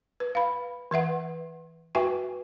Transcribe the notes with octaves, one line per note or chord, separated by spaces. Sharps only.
B4
F5 B5
E3 B4 E5 F#5
F#4 B4 E5 G5 G#5 C#6